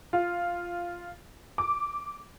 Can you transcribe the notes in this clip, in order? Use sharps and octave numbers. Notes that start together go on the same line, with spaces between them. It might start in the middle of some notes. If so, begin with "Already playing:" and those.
F4
D6